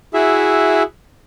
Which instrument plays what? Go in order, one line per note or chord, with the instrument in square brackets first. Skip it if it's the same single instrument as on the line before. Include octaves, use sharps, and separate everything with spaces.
[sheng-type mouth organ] E4 F#4 G#4 E5